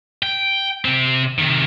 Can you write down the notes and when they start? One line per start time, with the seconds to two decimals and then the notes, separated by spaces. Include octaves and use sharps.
0.23 G5
0.85 C3 C4
1.39 C3 D#3